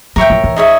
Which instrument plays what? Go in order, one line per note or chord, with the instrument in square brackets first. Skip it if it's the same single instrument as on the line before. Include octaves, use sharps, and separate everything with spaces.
[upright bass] F#3 [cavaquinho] A#4 C#5 E5 G5
[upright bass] F3
E3
[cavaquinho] D#4 G#4 C#5 E5